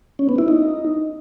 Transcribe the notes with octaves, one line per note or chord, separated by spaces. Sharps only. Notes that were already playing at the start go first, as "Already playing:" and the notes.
C#4
B3
E4
D#4